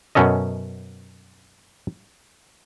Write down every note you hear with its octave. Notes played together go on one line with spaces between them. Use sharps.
F#2 B2 C#4 A4 D#5